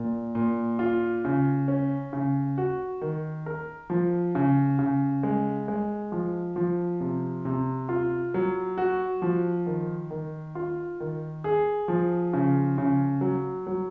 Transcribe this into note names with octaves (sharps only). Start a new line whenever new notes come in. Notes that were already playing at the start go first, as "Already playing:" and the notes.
Already playing: A#2
A#2
F4
C#3
C#4
C#3
F#4
D#3
A#4
F3
C#3
C#3
G#3
G#3
F3
F3
C3
C3
F4
F#3
F#4
F3
D#3
D#3
F4
D#3
G#4
F3
C#3
C#3
F#3
F#3